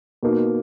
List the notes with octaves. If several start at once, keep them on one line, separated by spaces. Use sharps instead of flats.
B2 A#3 D#4